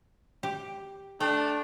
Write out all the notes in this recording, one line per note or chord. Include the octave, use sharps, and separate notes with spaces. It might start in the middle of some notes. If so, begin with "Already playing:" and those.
G4
A3 D4 G5